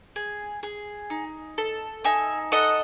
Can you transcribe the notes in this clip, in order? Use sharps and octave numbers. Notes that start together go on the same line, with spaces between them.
G#4
G#4
D#4
A4
D#4 E5 G#5
A4 D#5 F#5